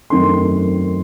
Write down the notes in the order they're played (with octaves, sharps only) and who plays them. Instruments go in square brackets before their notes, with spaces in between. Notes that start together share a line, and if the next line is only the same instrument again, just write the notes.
[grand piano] F#2 D#3 A3 C4 C6